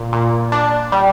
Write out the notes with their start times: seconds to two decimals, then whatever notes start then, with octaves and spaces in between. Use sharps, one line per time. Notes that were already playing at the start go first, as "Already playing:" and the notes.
Already playing: A#2
0.13 A#2
0.52 D4
0.92 G3